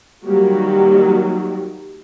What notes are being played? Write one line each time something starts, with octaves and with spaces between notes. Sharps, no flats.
D#3 F#3 G3 A#3 F#4 G4